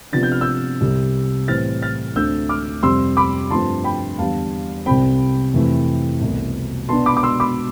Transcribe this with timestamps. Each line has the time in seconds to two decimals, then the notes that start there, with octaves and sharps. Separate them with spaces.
0.12 C3 F3 B3 D4 A6
0.23 G6
0.32 F6
0.41 E6 G6
0.81 C2 C3 G3
1.48 A2 E3 G3 C4 F6 A6
1.82 F6 A6
2.15 D2 D3 A3 C4 E6 G6
2.49 D6 F6
2.83 F2 C3 G3 C4 C6 E6
3.17 B5 D6
3.51 G2 F3 A3 C4 A5 C6
3.84 G5 B5
4.18 E2 D3 G3 F5 A5
4.86 C2 C3 G3 C4 G5 B5
5.53 F2 C3 E3 A3 C4
6.22 C2 B2 A3
6.89 B2 B3 D4 A5 C6
7.06 B5 D6
7.17 D6
7.23 C6 E6
7.40 B5 D6